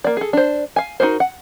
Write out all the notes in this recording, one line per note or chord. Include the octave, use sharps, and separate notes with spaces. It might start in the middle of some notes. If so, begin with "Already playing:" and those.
A#3 D5
G#4 A4
D4 C5
F5 G#5
D#4 E4 F#4 A#4 C5
F#5